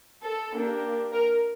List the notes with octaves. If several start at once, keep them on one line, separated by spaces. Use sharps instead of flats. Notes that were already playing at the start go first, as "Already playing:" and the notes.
A4
A#3 D4 G4
A#4